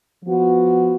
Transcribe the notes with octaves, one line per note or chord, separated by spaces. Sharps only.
F3 B3 F#4